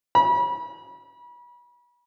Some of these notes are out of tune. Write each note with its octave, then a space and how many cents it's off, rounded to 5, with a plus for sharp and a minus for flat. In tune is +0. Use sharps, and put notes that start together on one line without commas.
B5 -35